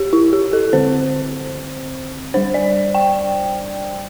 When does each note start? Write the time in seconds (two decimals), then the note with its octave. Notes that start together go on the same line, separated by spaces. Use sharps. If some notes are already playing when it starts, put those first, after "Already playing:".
Already playing: G4
0.13 E4
0.33 G4
0.53 A4
0.73 D3 C4 C5
2.34 G3 D4 C5
2.54 D5
2.95 G5